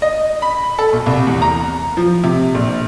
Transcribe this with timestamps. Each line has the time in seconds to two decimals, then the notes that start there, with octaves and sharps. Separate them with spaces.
0.02 D#5
0.42 B5
0.79 A4
0.93 B1
1.06 C2
1.27 E2
1.42 A#5
1.97 F3
2.24 C3
2.55 A#1